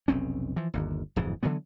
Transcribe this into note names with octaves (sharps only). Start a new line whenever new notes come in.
F1 B1 C4 C#4
E3 F3
G1 D#2
D1 F2 G#2 E3
D3 E3 F#3 B3